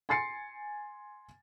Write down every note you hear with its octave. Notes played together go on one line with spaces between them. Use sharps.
G#5 C6 A6 C7 C#7